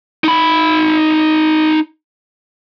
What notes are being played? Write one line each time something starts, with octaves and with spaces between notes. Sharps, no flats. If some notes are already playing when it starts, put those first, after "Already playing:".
D#4 B5